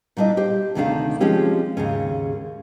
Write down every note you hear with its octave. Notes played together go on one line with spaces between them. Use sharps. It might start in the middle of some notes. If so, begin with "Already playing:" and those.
A#2 G3 D4 E4 D#5
G4 C5
D2 C3 D#3 A3 D4 F5
F3 G#3 C4 C#4 G4
D#2 G#2 C#3 C#4